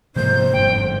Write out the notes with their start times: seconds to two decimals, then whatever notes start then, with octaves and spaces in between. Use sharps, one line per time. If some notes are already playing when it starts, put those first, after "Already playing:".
0.16 G#2 C3 F3 A#3 C5 G6
0.53 G1 F2 G5